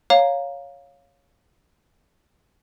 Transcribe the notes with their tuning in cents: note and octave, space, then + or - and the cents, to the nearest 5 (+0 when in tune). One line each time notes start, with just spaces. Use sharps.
C#5 +0 F5 +5 A#5 +0